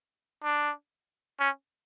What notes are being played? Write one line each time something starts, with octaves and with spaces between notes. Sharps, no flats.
D4
C#4